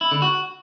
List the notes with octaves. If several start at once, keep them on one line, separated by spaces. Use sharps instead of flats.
E4
D3
F#4